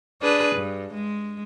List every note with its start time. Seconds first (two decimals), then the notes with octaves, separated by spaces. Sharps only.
0.22 D4 G#4 B4
0.56 G2
0.94 G#3